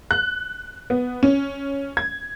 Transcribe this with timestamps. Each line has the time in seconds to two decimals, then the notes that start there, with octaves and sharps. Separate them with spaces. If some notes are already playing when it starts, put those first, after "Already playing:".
0.11 F#6
0.90 B3
1.23 C#4
1.97 G#6